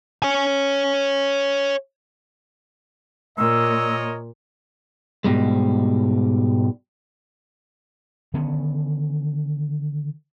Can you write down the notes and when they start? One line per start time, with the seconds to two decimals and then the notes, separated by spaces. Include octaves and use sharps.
0.22 C#5 G#5
3.38 A#2 A#4 C#5 D#5 E6
5.24 G#2 B2 G3 G#3
8.34 D3 D#3 B3 C#4